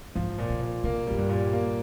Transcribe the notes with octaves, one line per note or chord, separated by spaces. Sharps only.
G#2 F3
A#2
C3
A#2
C3 A#3
G#2 G3
G2
A#2
A#3